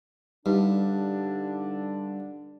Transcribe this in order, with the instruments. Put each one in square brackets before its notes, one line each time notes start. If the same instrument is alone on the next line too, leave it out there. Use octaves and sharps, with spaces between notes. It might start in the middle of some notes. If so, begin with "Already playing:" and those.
[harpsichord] G2 [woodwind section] D3 D4 [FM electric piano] G3 D#4